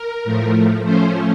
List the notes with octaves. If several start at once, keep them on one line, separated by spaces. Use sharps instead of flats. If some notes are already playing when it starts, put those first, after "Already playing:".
Already playing: A#4
A2 F3 A3
F3 A3 C#4 C5